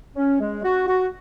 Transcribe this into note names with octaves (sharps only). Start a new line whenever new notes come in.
C#4
G#3
F#4
F#4